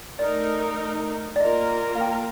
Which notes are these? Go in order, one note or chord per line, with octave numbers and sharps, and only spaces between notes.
A3 D#4 A#4 D5
D5
A#3 F4 A#4 D#5
F5
G5